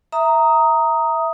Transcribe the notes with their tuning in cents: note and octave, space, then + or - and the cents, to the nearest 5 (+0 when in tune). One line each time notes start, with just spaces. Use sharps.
E5 +0 A#5 -5 D#6 +10